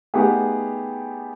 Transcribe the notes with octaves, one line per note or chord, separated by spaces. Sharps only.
A3 B3 D#4 G4 G#4